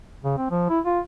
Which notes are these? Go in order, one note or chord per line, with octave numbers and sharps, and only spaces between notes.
C#3
C4
F3
E4
F4